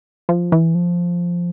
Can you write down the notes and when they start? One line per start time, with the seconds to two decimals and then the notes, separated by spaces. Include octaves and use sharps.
0.29 F3
0.52 E3
0.75 F3